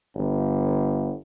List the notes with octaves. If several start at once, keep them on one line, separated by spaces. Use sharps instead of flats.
G1